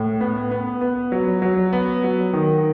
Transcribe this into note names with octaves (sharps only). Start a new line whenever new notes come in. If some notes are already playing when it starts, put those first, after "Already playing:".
Already playing: A2
B3
B3
B3
F#3
F#3
B3
F#3
D#3